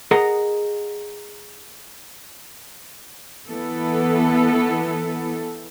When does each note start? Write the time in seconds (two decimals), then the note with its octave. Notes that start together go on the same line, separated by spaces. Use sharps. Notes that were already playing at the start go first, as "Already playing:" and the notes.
0.11 G#4 A#4 D#5 F#5 A#5
3.49 E3 B3 A4